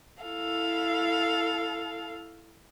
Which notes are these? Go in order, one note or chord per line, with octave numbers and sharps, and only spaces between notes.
E4 A4 F5